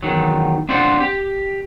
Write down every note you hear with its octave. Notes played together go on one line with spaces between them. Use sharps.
E2 G#2 D#3 F#3
C4 D4 F4 C5 F#5
G4